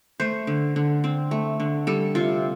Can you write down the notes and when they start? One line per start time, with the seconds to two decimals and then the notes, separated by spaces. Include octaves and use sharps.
0.20 A3 C5
0.47 D3
0.76 D3
1.04 C4
1.31 A3
1.60 D3
1.87 G3 A4
2.15 C3 F4